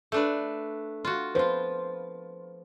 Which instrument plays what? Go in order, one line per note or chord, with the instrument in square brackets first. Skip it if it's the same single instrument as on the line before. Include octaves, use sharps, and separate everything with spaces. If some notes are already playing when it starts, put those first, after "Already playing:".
[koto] A3 D4 B4
F4 F#4
[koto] F3 F4 [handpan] B4 C5